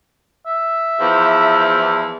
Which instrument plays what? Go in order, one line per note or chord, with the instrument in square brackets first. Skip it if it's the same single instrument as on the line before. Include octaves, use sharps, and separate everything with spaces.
[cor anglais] E5
[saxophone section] E2 F3